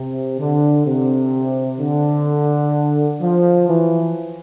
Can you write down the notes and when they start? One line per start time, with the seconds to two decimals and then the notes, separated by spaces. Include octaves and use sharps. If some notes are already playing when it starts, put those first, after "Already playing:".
Already playing: C3
0.39 D3
0.86 C3
1.80 D3
3.21 F3
3.68 E3